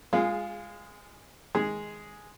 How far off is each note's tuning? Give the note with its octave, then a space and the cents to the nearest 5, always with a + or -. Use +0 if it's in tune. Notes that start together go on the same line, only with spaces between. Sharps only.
G#3 -20 F4 +0 G#4 +5
D#3 +20 G#3 +0 G#4 +0